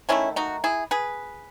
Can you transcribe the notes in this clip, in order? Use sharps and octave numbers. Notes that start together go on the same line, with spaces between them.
D#3 F#3 A3 C#4 E4
D#4 F#4
E4 G#4
G#4 B4